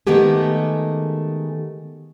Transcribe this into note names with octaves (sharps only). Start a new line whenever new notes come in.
D#3 G#3 A3 B3 G4 G#4